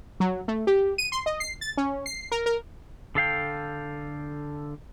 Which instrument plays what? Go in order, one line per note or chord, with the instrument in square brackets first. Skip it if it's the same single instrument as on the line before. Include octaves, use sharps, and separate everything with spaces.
[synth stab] F#3
A3
G4
D#7
C6
D#5
C7
A6
C#4
C7
A#4
A#4
[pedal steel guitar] D3 A4 F5 G5